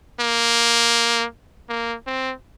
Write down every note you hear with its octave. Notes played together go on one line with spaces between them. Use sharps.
A#3
A#3
C4